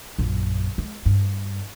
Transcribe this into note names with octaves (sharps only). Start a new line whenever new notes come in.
A#1 F#2
G#3
G2